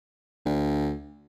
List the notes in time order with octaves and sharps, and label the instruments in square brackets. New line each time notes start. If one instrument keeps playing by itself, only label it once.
[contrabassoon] D2